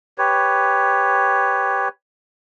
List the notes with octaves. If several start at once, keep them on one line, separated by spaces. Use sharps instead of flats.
G4 B4 C#5